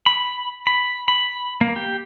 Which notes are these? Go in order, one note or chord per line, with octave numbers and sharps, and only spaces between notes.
B5
B5
B5
A#3
G4